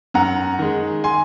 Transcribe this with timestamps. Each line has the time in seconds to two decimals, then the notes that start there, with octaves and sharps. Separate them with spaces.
0.14 F#2 F#5 A#5
0.59 D#3 G#3
1.04 G#5 C6